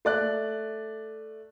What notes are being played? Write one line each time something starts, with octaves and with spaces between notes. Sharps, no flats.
A3 D5 F#6